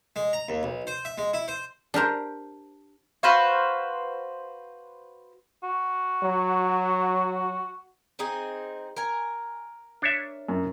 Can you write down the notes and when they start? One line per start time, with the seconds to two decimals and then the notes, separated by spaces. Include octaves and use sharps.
0.16 G#3
0.33 A#5
0.49 D#2
0.63 B1
0.87 C5
1.05 E5
1.18 G#3
1.34 E4
1.48 C5
1.94 D4 G4 A#4 C5
3.23 F#4 B4 C5 F5
5.63 F#4
6.23 F#3
8.19 C4 D#4 G#4
8.96 A#4 G#5
10.02 D4 C#5 E5
10.49 F#2